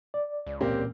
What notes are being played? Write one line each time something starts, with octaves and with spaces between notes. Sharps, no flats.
D5
C#2
E1 A#2 A#3 C4 C#4 G4